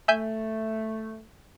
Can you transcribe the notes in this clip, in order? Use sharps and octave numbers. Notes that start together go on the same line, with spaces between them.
A3 E5 G#5 G6